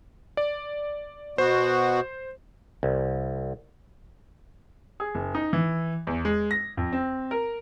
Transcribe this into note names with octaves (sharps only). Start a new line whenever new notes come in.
D5
B2 B3 F#4 C5
C2
G#4
F#1
D#4
E3
E2
G#3
A#6
F2
C4
A#4